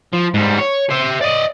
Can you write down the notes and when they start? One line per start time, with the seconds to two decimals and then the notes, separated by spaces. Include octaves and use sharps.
0.13 F3
0.34 G#2 G3
0.59 C#5
0.90 C5 E5
1.21 D5 D#5